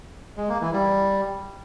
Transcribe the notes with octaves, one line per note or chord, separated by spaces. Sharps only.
G#3
A#3
E3
G3